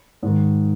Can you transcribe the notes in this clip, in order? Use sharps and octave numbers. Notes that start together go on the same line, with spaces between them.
G#2 D#3